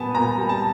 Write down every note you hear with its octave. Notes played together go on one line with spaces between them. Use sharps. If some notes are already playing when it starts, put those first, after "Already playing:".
Already playing: A#2 G3 B3 G#5 A5
A#2 A#5
G3
A5